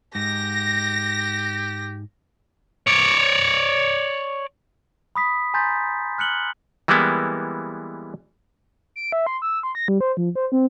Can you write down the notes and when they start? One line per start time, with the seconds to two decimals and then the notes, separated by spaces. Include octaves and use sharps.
0.15 G#2 G4 A#6
2.87 C#5 D5
5.15 B5 D#6 B6
5.54 G#5 A#5 C6 G6 A6 B6
6.18 F6 F#6 C#7 F#7 G7
6.88 E3 G3 G#3 A#3 B3 E4
8.96 D7
9.12 E5
9.27 C6
9.42 E6
9.63 C6
9.75 A#6
9.88 G3
10.00 C5
10.17 F3
10.35 C5
10.52 C4